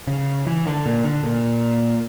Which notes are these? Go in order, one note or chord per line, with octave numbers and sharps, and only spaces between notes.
C#3
E3
D3
A#2
D3
A#2